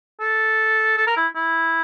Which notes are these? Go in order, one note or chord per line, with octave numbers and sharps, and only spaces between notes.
A4
A4
A#4
E4
E4